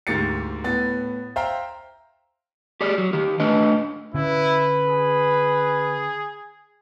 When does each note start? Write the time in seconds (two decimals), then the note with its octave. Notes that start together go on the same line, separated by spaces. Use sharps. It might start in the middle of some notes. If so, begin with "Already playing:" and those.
0.07 D2 G#2 A#3 G4 A6 C#7
0.64 A2 B3 A6
1.36 C5 E5 F5 G5 A#5
2.81 G4 G#4 D5
2.98 F#3
3.13 D#3 G4
3.40 A3 D4 B4 D#5
4.14 D3 C#4 E4 B4
4.88 G#4